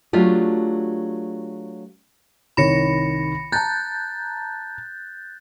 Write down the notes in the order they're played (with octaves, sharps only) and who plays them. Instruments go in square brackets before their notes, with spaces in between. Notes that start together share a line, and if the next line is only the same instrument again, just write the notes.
[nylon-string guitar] F#3 A3 D4 F4 G4
[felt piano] C2 D#3 C#5 [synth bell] B5 A#6 C#7
[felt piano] A5 A#5 [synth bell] F#6 G6 A6